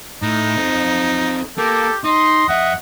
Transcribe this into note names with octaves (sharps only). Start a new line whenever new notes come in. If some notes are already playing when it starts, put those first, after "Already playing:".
A2 D#4
C4 A4
A#3 G4 A4
D#4 D#5 C6
F2 E5 F#5